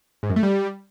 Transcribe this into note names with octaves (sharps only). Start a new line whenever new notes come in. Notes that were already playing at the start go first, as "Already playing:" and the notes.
G#2
F#2
A3
G3